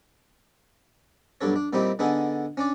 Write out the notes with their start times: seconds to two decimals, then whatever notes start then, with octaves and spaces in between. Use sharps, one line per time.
1.41 B1 G2 D4 A4 C#5
1.56 D4
1.73 A#2 G3 C4 D#4 E4 G4
1.99 D3 B3 D4 D#4 G#4 A4
2.57 C#4 D4 D5